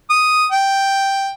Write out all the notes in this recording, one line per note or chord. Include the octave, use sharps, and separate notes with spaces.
D#6
G5